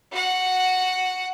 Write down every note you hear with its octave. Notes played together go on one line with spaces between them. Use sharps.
F#4 F#5